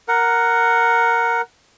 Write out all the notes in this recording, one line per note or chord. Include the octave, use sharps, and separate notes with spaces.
A#4 F#5